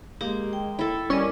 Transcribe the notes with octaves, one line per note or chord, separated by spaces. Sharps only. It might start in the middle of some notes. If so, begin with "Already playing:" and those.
G#3 A#3 G4
G5
E4 A4
G3 C#4 A#4 D#5 D6